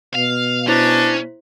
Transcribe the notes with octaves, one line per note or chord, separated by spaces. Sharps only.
B2 F5
C#4 D4 E4 C5